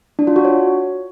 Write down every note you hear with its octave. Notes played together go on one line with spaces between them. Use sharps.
D4
F4
F#4
C#5